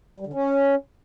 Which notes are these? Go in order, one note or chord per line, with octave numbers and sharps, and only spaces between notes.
G3
D3
C#4